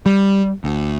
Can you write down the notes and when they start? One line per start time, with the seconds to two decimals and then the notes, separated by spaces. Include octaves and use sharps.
0.06 G3
0.64 D2